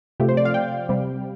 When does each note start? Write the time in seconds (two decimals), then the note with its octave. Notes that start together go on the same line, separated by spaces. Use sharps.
0.20 C3 F3 A3 G4
0.29 C5
0.37 D5
0.45 F5
0.54 G5
0.89 C3 G3